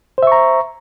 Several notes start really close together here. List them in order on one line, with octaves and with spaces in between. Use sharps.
C5 E5 C#6 A#5